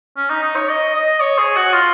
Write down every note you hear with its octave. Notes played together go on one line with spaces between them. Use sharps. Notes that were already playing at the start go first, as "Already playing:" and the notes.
C#4
D#4
D#4
C#5
D#5
D#5
C#5
G#4
F#4
F4